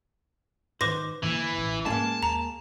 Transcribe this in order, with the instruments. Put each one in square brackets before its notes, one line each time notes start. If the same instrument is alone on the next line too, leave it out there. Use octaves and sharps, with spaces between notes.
[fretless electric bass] G#2 D#3 [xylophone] B4 D6 A#6 [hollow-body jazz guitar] C5
[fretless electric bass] G2 D3 A#3 [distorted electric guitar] E3
[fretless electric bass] A1
[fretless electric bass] G#2 C#4 [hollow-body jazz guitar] G#3 A#3 [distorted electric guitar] A5
[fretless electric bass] D#2 [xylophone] A#5